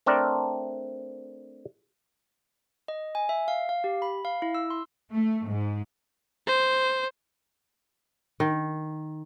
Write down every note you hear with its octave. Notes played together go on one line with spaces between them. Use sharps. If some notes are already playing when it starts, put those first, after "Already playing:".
A3 C4 D4 A#4 D5
D#5
G#5
E5
F5
F5
G4
B5
F5
E4
E6
C6
A3
G#2
C5
D#3